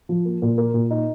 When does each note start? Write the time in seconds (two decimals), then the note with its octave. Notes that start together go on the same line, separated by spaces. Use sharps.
0.09 F3
0.25 A#3
0.42 A#2
0.58 A#3
0.74 A#2
0.90 D#4